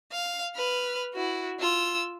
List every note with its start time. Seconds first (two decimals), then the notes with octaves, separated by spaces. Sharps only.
0.12 F5
0.56 B4 F6
1.14 E4 F#4
1.60 F4 E6